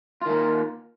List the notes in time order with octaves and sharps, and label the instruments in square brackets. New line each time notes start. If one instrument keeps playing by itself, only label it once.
[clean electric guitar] F4
D#3
A#3